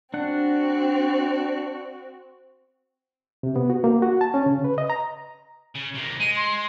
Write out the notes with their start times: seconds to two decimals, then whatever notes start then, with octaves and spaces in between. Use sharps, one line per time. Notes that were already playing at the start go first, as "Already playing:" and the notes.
0.14 C4 D4 F#4 F#5
3.43 C3
3.56 B3
3.70 F#4
3.84 A#3
4.02 F#4
4.21 A5
4.34 C#4
4.46 C#3
4.64 B4
4.78 D#5
4.90 A#5
5.75 C#3
5.95 C3 A#3
6.20 G#3 D#7
6.36 C6